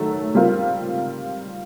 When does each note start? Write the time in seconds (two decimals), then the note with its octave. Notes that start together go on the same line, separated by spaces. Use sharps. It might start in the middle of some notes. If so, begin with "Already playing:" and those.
Already playing: D#3 F#3 A3
0.35 G3 C4 F4 A#4